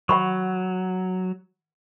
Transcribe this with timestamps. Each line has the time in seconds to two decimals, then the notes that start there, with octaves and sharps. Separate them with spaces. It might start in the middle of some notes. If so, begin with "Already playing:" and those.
0.09 F#3 F#5 B5 C#6